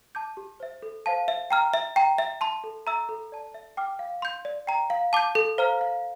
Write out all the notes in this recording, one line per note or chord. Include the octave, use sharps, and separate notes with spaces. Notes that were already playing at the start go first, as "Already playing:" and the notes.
A5 D6 G6
G4
C5 E5
A4
C5 F5 A5
E5
G5 A#5 F6
E5
G5 A#5
E5
A5 C6
A4
E5 A#5 E6
A4
D5 A5
E5
G5 D6 F6
F5
C6 G6
D5
G5 A#5
F5
A5 D6 G6
A4
C5 F5 A#5 F6
F5